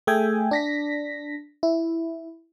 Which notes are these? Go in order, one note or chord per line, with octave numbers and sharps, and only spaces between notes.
A3 G#4 E5 G5 G#5
D4 A#6 B6
E4